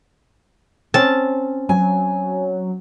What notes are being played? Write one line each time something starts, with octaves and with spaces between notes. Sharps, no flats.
C4 C#4 A5
F#3 G#5